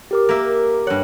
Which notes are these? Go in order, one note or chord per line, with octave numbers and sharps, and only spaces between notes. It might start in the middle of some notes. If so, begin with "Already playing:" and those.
G4 A#4 D6
A#3 E5
G2 C#5 F#5